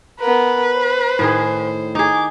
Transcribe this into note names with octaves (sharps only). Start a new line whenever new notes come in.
B3 A#4 B4
C5
A2 D#3 G#4
D#4 G#4 D6